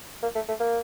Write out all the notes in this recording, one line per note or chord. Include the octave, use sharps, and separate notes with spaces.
A#3
A3
A3
A#3